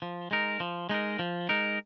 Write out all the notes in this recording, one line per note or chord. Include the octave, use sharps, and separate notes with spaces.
F3
G#3 D#4 A#4
F3
G#3 D#4 A#4
F3
G#3 D#4 A#4